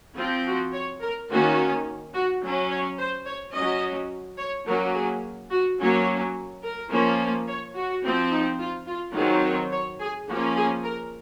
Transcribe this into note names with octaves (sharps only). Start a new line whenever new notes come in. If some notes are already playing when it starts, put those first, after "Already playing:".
F3 C4 F4
F#4
C#5
A#4
D#3 A#3 C#4 F#4
F#4
F#3 C#4
C#5
C5
C#5
F#3 C#4 D#5
C#5
F#3 A#3 C#4 A#4
G#4
F#4
F#3 A#3 C#4 C#5
A#4
F3 A#3 C#4
C#5
F#4
F3 C4
D#4
F4
F4
D#3 F#3 C4 G#4
C#5
C#5
G#4
F3 A#3 C#4 F#4
G#4
A#4